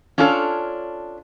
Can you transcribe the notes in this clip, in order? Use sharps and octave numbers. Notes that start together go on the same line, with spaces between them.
C#4 D4 F4 A4 B4 C#5